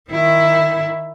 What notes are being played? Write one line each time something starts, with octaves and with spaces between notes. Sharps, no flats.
D#3 E4